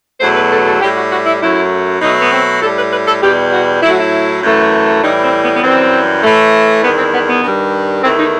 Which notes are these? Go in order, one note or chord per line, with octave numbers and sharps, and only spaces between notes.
E2 B2 F#3 A3 C5
B4
A4
A4
A2 G3 G4
F#4
F#4
E4
F#2 F#3 A3 E4
B2 F#3 A3 D#4
B3
C4
A2 G3 A4
B4
B4
A4
E2 B2 G3 G4
F#4
A2 F#3 A3 E4
F#4
E4
F#2 E3 A3
A2 E3 G3 D#4
C4
B3
B3
F#2 E3 G3 C4
A2 E3 A3
E2 D#3 G3 B3
C4
B3
B3
G2 D#3 G3
E2 D#3 A3 C4
D#4